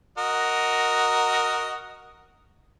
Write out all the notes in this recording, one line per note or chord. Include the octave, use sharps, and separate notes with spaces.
F#4 A#4 D#5